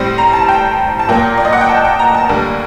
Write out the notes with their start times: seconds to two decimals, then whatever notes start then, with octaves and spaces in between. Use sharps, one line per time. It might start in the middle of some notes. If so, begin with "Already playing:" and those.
Already playing: A2 G3 C4
0.18 A#5
0.33 A5
0.49 G5
0.99 A5
1.08 A#2 F#3 A#3 G5
1.38 D5
1.45 D#5
1.53 F#5
1.61 G5
1.69 A5
1.84 G5
1.99 A#5
2.15 A5
2.29 D2 D3 G3 A#3